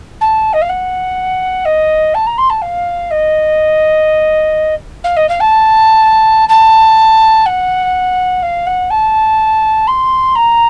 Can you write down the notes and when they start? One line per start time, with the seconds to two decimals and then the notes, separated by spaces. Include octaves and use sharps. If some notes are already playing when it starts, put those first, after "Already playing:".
0.21 A5
0.53 D#5
0.61 F5
0.69 F#5
1.65 D#5
2.14 A5
2.26 A#5
2.38 C6
2.50 A5
2.62 F5
3.11 D#5
5.04 F5
5.16 D#5
5.29 F5
5.40 A5
6.49 A5
7.46 F#5
8.42 F5
8.66 F#5
8.90 A5
9.87 C6
10.35 A#5